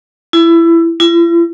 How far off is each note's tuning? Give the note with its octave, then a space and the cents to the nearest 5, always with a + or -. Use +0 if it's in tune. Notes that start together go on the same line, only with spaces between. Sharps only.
E4 +20
E4 +45